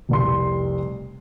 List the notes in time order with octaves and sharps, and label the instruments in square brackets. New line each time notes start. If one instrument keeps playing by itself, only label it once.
[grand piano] F1 C2 C6